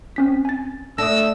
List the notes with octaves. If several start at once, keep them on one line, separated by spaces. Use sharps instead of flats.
C4 C#4 B6
G#5 A6
A3 D4 D#6 E6 A#6